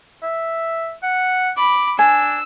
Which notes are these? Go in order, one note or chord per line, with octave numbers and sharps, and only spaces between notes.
E5
F#5
B5 D6
D4 G#5 E6